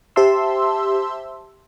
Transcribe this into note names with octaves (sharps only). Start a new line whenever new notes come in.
G4 C5 E5 A5 C6 E6